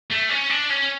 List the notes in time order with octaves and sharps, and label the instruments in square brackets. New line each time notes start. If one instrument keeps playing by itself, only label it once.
[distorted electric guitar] A3
C#4
D4
C#4